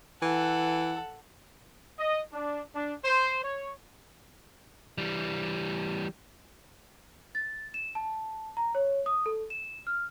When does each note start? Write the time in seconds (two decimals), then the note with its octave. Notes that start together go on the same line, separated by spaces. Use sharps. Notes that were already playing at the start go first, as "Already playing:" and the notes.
0.22 E3 A4 F#5
1.98 D#5
2.33 D4
2.75 D4
3.04 C5
3.44 C#5
4.98 E3 G3
7.35 A6
7.74 E7
7.95 A5
8.57 A#5
8.75 C#5
9.06 D#6
9.26 A4
9.50 E7
9.87 F6